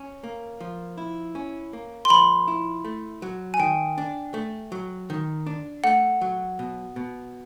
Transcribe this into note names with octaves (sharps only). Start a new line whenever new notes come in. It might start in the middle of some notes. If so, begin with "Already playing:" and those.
Already playing: C#4
A#3
F3
E4
C#4
A#3
C6
F3 B5
E4
A3
F#3
G#5
D#3 G5
D4
A3
F#3
D#3
D4
A3 F#5
F#3
B2
B2